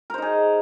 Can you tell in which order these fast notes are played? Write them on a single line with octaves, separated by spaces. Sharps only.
A#4 C5 D#4 G#4